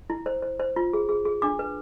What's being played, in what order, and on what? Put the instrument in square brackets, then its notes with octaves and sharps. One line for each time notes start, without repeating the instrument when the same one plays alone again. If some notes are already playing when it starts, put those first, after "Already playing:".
[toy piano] E4
C5
C5
C5
F4
G#4
G#4
G#4
D4 D6
B4